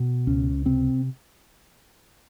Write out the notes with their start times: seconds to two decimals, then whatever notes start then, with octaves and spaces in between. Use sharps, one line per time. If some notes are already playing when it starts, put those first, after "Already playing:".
Already playing: B2
0.27 C#2 C#4
0.65 C3 C4